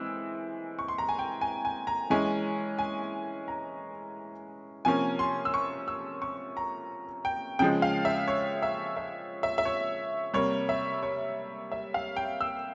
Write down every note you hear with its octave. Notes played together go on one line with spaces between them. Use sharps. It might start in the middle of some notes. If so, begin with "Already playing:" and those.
Already playing: E3 G#3 C4 E6
C#6
C6
A#5
G#5
G5
G#5
G#5
A#5
E3 G#3 C#4 G#5
G#5
A#5
C3 F3 A#3 C#4 G#5
C6
E6
C#6
E6
C#6
A#5
G5
C#3 F3 G#3 G5
F5
E5
C#5
E5
E5
E5
E5
C#5
C3 G3 A#3 C#5
E5
C#5
E5
F5
G5
E6